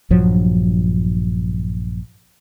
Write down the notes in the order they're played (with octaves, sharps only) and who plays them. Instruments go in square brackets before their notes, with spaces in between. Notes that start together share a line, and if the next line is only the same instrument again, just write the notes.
[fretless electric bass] A#1 G2 F3 F#3